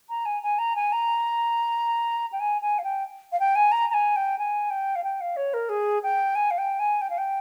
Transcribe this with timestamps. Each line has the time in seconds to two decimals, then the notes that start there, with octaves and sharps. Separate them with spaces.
0.09 A#5
0.25 G#5
0.43 G#5
0.58 A#5
0.76 G#5
0.92 A#5
2.32 G5
2.40 G#5
2.62 G#5
2.78 F5
2.84 G5
3.32 F5
3.40 G5
3.55 G#5
3.72 A#5
3.90 A#5
3.93 G#5
4.16 G5
4.38 G#5
4.70 G5
4.95 F5
5.04 G5
5.21 F5
5.36 C#5
5.54 A#4
5.69 G#4
6.03 G5
6.35 G#5
6.51 F5
6.58 G5
6.79 G#5
7.01 G5
7.10 F5
7.18 G5